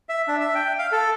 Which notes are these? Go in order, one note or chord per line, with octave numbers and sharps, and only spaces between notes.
E5
D4
E5
G5
F5
A4